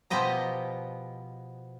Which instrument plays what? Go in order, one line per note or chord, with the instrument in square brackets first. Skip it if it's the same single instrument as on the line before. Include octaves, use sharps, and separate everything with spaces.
[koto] B2 F3 B3 G4 D#5 A#5